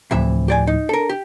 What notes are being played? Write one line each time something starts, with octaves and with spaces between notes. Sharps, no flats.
D2 A2 C3 E3 F3 E5
G4 D5 G#5
D#4
D4 A4 A#4
G4